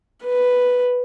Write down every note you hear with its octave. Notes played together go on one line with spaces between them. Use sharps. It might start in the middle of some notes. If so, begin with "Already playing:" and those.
B4